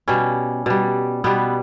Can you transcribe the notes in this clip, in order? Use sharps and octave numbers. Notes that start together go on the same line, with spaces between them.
B2 G3 C#4
B2 G3
B2 G3 B3